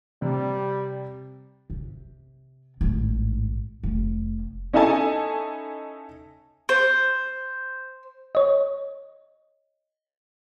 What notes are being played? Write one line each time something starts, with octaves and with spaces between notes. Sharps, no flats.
C3 G3
C3
A1 G#2
F1
C#4 D#4 E4 A4 G#5 A5
C5
C#5 D#5